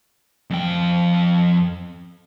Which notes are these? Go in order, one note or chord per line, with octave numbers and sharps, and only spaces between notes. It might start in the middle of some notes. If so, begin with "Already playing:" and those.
F2 G5